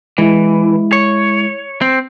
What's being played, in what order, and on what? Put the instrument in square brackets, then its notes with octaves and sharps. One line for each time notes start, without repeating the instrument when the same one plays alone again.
[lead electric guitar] E3 [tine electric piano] G#3 E4
[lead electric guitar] C#5
C4